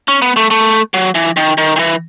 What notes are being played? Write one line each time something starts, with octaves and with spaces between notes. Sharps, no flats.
C#4
B3
A3
A3
F#3
E3
D#3
D#3
D#3
E3